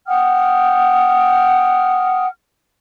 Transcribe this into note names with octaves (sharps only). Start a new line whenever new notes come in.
F#5 G5 D#6 F6